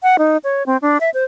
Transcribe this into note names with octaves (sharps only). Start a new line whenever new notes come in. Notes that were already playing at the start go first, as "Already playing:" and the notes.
F#5
D#4
C#5
C4
D4
E5
C5